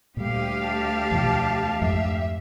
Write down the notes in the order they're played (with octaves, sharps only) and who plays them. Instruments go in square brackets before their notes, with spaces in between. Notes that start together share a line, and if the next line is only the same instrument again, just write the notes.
[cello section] D2 G4 F5 [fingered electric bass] A#2 G3
[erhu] A5
[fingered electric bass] E2 B2 F3
[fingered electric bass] F2 G#2 [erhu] E5